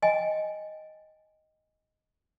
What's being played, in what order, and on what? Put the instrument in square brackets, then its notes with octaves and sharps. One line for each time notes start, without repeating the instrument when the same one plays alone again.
[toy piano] D#5 G5 G#5